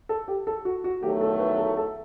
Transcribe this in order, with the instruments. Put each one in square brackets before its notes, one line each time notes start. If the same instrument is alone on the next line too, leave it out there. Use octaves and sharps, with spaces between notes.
[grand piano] A4
G4
A4
F#4
F#4
[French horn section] E2 D#3 F#3 A3 [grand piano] G4
[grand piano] A4
B4
A4
A4